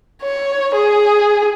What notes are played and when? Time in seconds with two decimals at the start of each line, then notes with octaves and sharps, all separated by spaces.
0.22 C#5
0.75 G#4